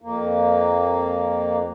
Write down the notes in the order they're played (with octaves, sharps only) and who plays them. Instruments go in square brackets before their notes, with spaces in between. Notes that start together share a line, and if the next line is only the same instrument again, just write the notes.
[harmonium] F2 A#3